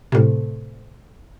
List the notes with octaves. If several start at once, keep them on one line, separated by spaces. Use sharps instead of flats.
A2 C3